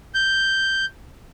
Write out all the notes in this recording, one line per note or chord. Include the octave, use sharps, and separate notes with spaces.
G6